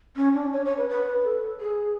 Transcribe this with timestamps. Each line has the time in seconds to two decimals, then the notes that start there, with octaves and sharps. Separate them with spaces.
0.16 C#4
0.34 D4
0.53 C#5
0.65 C#5
0.77 B4
0.89 B4
1.24 A4
1.60 G#4